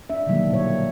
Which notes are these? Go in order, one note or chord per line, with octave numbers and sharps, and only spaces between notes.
D4 E5
B2 D3 D#3 F#3 G3 A#3
A#2 C#5